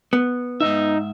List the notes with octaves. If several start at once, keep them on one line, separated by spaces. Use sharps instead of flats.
B3
G#2 B2 D#4 E5